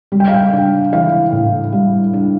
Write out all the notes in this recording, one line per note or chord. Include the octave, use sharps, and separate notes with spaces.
G3
G5
F5
G5
D4
E3 F5
A2
G3
D4